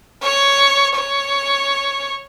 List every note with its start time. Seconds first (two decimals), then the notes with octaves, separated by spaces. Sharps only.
0.23 C#5
0.95 C#5